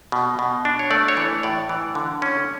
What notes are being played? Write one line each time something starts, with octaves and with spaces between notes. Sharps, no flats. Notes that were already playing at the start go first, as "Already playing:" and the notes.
B2
B2
D4
C#5
A3 D5
C#5
E3
A2 D5
E3
D3
C#4